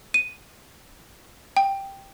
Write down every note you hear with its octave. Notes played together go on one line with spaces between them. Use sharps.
D#7
G5